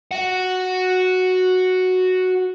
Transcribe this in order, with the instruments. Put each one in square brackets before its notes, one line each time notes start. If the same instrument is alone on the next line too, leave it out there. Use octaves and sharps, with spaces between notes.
[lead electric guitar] F#4 F#5